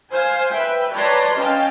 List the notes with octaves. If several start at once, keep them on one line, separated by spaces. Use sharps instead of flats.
C5 F5 G#5
B4 E5 G5
B4 C#5 D5 A5 A#5 C6
C#4 D#5 F5 G5 A5